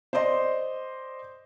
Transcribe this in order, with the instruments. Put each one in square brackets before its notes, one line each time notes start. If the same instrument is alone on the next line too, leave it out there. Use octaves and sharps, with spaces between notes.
[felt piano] C5 D5 D#5 C6